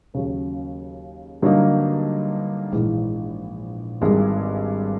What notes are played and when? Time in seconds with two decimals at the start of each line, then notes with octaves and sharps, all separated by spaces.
0.14 D#2 C#3 F#3
1.42 G2 D3 F#3 A#3 D#4
2.72 A#1 G#2 E3 G#3
4.01 G#1 G2 D#3 G#3